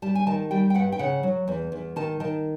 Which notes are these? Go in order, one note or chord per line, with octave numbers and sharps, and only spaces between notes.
G3 A5
G#5
D#3 A5
G3 G5
G5
G2 F#5
G5
C#3 F#5
F#3
E2
E2
D#3 A5
D#3 A5